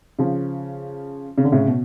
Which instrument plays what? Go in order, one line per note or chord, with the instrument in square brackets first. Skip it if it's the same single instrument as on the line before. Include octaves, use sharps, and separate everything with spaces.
[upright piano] C#3 F3
C#3
D3
A2 C#3
B2